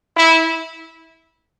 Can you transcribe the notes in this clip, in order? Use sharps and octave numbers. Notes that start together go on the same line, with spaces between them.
E4